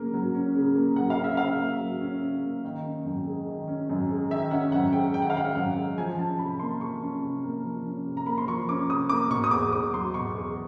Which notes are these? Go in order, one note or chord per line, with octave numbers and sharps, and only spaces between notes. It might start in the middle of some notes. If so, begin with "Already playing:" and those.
Already playing: C#3 F#3 A#3 C#4
F#3
C#4
C#3
A#3
F#3 F#5
F5
C#4
E5
C#3 F5
A#3
F#3
C#4
C#3
A#3
D#3
C#4
F#2
G#3
D#3
C#4
F#2
G#3
D#3 E5
C#4 F#5
F#2 F#5
G#3 G5
D#3 G5
F#5
F5
C#4 F#5
F#2 F#5
G#3
F3 G#5
C#4 A5
C3 B5
A#3 C6
F3 C#6
C#4
C3
A#3
F3
C#4
C3
A#5
A#3 B5
C6
F3 C#6
C#4 D6
C3 D#6
A#3 D6
B2 C#6
D#6
E2 D6
E2 D6
F#3 C6
B2 C#6
E2